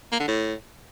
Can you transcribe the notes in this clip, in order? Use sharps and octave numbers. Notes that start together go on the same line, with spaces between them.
A#3
D3
A2